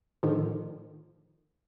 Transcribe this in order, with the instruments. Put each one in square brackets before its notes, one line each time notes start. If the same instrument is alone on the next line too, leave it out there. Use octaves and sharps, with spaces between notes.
[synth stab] A2 D3 D#3 F3